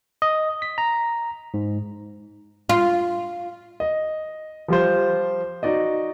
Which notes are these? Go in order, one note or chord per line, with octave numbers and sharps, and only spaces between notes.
D#5
B6
A#5
G#2
F4
D#5
F3 G3 F4 C5
D#4 F#4 D5 D#5